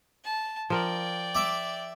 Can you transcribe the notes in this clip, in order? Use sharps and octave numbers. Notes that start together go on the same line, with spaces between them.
A5
F3 A#4 D5 G5
E5 D6